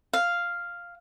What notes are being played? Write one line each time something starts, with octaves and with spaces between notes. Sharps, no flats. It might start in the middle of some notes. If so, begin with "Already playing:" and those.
F5